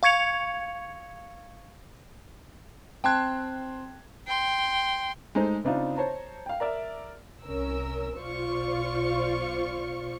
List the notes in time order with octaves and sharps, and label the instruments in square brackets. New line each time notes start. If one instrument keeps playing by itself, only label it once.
[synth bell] F5 C#6 G#6 C#7 F7
[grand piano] C4 C6 G#6 [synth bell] G5 A5 F#6
[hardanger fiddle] G5 C6
[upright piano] G#3 A3 D#4 A4 C5
C#3 C4 D4 D#4 F4
C5 C#5 A5 A#5
F5 G5
A#4 D5 E5
[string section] C2 C#4 A#4 E6
B1 F4 C5 D5 F5 C#6